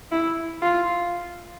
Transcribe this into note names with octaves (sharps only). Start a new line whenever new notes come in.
E4
F4